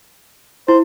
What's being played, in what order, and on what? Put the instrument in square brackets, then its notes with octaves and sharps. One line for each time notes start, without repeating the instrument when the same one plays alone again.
[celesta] E4 [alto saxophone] C5